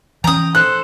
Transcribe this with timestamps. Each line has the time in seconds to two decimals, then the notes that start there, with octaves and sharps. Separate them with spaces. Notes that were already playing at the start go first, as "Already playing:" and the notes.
0.24 E3 C#4 G5 A#5 D#6
0.55 A4 C5 F#6